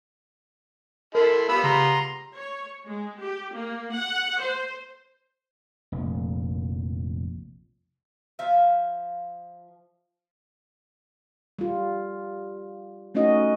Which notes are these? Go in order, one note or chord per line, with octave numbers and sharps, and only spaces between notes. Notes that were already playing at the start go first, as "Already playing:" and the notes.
E4 A4 A#4 C6
G3 B3 F4 B5 E6
C#3 A#5 C6
C#5
G#3
G4
A#3
F#5
C5
F1 A#1
F3 E5 F5
G3 F4
A3 C#4 D#4 F#4 D#5